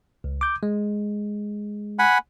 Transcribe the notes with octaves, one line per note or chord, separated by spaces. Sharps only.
C#2
D6 G6
G#3
F#5 G#5 B5